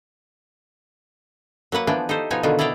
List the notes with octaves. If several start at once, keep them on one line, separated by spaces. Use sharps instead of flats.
F#3 A#3 B4 F#5
E3 F3 B3 D4 G5 G#5
D#4 G4 A4 C5
B2 F3 B3 D#4 C#5 G#5
B2 D3 D#3 B3 F4 F#4
E4 D5 D#5 F5 G5 A5